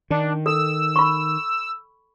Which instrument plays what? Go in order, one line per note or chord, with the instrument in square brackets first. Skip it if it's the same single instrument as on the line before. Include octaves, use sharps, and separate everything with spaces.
[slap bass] D#3 [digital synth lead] D4
[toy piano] A4 [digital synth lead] E6
[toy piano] B5 C#6